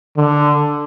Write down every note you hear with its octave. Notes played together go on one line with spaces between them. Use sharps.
D3